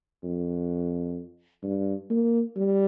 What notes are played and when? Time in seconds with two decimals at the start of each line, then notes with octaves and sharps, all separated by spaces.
0.23 F2
1.63 G2
2.10 A#3
2.56 G3